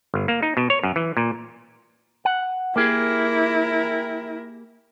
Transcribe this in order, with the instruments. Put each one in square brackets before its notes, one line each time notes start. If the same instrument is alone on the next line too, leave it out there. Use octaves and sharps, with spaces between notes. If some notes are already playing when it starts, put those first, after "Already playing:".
[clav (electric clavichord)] G1
A#3
D#4
B2
C#5
F#2
E3
A#2
[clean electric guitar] F#5
[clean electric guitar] A#3 G4 G#4 [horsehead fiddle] E4 A#4